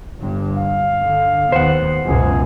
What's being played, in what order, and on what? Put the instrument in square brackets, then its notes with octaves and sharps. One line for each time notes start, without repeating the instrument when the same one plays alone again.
[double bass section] G1 G2
[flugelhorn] F5
[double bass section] D3
[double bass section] D#2 B3 [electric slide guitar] C5 F#5
[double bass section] C#2 F#2 B2 [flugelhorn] G#4